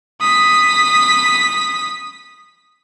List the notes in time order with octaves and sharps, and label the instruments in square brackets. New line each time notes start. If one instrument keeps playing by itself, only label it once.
[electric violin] D#6 B6